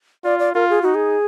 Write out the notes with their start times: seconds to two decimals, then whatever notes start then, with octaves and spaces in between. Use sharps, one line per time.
0.24 F4 D5
0.39 D5
0.54 F4 A#4
0.70 G#4
0.82 D#4 F#4
0.95 G#4